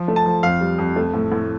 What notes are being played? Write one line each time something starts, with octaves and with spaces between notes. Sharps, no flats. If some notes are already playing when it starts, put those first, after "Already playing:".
Already playing: F3
A3
A5
F3
F2 F5
G3
F2
A3
A2
A2